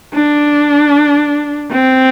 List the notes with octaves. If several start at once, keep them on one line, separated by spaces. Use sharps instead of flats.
D4
C4